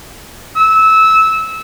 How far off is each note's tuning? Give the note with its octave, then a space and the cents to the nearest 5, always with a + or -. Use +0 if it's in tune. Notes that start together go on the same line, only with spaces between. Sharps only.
E6 -20